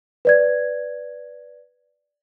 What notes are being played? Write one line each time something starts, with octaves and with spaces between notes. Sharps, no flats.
B4 D5 G#6